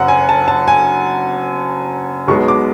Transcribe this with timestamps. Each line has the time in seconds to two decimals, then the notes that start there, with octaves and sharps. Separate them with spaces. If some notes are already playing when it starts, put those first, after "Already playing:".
Already playing: F#1 F#2 F#5
0.08 G#5
0.29 A5
0.48 A5
0.68 G#5
2.28 B1 B2 G#3 B3 C#6
2.48 D6